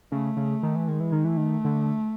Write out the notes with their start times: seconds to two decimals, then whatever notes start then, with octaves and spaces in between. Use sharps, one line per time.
0.12 C#3 A3
0.37 C#3
0.63 D#3
0.76 E3
0.88 D#3 G#3
1.00 E3
1.12 D#3
1.24 E3 A3
1.37 D#3
1.65 D3